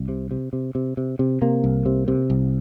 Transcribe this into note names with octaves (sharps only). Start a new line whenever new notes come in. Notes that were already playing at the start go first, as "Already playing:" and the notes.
Already playing: C2
C3
C3
C3
C3
C3
C3
C3 A#3
C2
C3
C3
C2